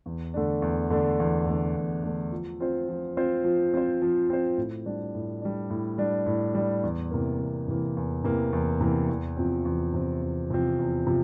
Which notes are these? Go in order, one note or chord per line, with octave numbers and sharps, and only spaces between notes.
E2
D3 A3 D4
E2
D3 A3 D4
E2
D3 A3 D4
E2
D3 A3 D4
F3
C4 F4 C5
F3
C4 F4 C5
F3
C4 F4 C5
F3
C4 F4 C5
A2
G3 D4
A2
G3 D4
A2
G3 D4
A2
G3 D4
E2
C3 E3 A#3
E2
C3 E3 A#3
E2
C3 E3 A#3
E2
C3 E3 A#3
E2
C3 F3 C4
E2
C3 F3 C4
E2
C3 F3 C4
E2
C3 F3